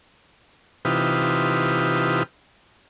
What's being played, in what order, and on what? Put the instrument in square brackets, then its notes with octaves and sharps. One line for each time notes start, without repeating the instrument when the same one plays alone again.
[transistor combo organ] C3 E3 D#4 F4 G4 B4